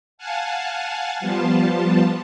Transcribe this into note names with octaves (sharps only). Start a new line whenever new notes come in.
F5 F#5 G#5 A5
F3 G3 B3 F4 A5